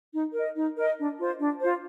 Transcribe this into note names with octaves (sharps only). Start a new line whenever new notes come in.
D#4
A#4 D#5
D#4
A#4 D#5
D4
F4 C5
D4
F4 C5